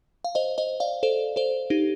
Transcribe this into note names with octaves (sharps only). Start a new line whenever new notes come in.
F5
C5 D#5
C5 D#5
D5 F5
A4 C5
A4 C5
D#4 G4